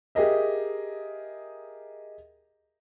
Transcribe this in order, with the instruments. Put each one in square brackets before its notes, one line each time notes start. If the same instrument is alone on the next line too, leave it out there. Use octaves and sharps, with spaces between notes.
[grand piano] G4 G#4 A#4 D#5 E5